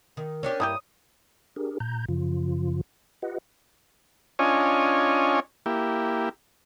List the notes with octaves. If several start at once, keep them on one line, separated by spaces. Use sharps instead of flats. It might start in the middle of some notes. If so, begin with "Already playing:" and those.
D#3 A#4
C#4 D4 G4
G2 A#3 E4 G4 D#6
D4 G4 G#4 A#4
A#2 A#5 G6
F#2 C#3 F3 F4
F4 G4 B4 D#5 F#5
C#4 D4 F4 C#5 D#5 G#5
A#3 E4 G4